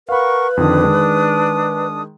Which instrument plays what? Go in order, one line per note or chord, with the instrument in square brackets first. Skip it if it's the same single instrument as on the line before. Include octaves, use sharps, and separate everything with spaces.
[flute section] A#4 F#5 C#6 [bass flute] B4 [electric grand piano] F5 B5
[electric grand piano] F2 D3 D#3 [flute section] D4 D#6
[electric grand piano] D#3 G#3